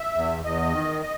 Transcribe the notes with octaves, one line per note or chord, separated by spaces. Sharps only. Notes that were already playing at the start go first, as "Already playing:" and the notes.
Already playing: E5
E2
E2 D#5
D#3
D#5